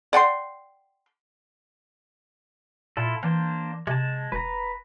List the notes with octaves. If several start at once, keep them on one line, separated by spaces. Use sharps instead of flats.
D5 F#5 G5 C6
A#2 E4 F4 A4
E3 A#3 D4 C5
C3 G#3 A5
E1 B4 A#5